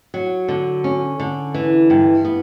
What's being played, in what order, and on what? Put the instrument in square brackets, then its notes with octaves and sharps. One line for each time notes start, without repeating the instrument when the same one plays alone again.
[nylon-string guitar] F#3
D3
C#4
D3
E3
G2
B3